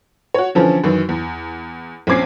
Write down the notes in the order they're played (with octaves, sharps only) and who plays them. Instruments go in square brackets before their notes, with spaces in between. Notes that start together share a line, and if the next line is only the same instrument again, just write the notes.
[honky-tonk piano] F#4 C#5
D3 E3 F3 C#4
F#2 D#3 E3
E2
A#1 C4 C#4 D6 G#6 C7